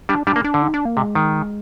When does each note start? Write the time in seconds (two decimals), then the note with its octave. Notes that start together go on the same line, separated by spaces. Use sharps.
0.09 G3 D4
0.27 G3 D4
0.36 A#3
0.44 D4
0.54 D3
0.62 D#4
0.74 D4
0.85 A#3
0.97 C3 G#3
1.15 D#3